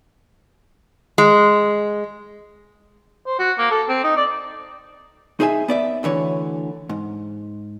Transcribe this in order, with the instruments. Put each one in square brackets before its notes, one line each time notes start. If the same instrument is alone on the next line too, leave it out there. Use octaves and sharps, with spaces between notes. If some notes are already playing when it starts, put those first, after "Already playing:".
[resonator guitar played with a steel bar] G#3
[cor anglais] C5
F#4
A#3
A4
C4
D#4
D5
[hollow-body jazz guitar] D#4 G#4 C5 E5 G#5
B3 D5 E5
D2 D3 E3 C#5
G#2